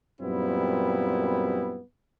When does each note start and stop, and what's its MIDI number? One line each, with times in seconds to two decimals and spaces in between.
0.21 1.80 42
0.21 1.80 46
0.21 1.80 55
0.21 1.80 59
0.21 1.80 60
0.21 1.80 64